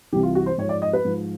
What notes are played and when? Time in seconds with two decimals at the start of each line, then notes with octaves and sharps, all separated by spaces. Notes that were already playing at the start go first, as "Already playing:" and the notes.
0.13 C2 C3 E3 G4
0.23 F4
0.35 F#4
0.46 C5
0.58 G#2 F3 C#5
0.69 D5
0.82 D#5
0.93 B4
1.05 G#2 F3